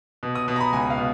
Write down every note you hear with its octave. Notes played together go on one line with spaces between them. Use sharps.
B2
D#6
B2
A#5
B5
C#2 G#5
F5
B2